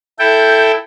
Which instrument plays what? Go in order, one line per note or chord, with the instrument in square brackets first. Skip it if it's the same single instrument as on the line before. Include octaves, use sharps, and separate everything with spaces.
[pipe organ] E4 A4 G5 [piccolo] G6